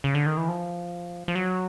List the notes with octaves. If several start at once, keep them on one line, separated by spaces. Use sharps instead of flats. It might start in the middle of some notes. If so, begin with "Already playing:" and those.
C#3
D3
D#3
E3
F3
F3
F#3